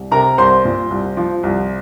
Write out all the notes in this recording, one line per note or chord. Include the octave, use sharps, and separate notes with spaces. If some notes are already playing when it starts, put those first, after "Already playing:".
Already playing: C2
C3 A#4 A#5
C2 C5 C6
A#2
C2
F3
C2